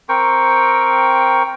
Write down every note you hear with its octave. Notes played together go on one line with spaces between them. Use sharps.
C4 A#4 G5 C#6